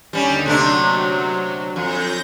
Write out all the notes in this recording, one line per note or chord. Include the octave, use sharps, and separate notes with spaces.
D#2 D3 G3 C#4 D#4
C3 F#3 A3 D4
F2 G6 A#6